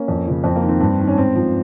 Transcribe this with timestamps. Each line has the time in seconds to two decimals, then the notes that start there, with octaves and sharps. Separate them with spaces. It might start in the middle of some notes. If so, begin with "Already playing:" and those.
Already playing: A#3 C#4
0.08 F2
0.27 C#3 F3
0.44 F2 C4
0.56 A#3
0.63 D#3
0.69 C4
0.81 G2
0.99 D#3
1.08 C#4
1.17 G#2 C4
1.35 F3